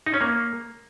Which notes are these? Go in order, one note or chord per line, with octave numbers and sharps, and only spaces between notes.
D#4
C#4
A#3